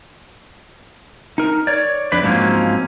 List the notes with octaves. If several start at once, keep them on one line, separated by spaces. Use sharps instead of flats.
D#4 A#4
C#5 D5
F2 D4 B4
G#2 F3 F#3 A#3 C4 C#4